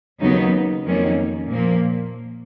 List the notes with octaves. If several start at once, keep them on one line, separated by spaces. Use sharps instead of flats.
D#2 C#3 F#3 B3 D#4
F2 D#3 F#3 A#3 C#4
A#2 F3 A#3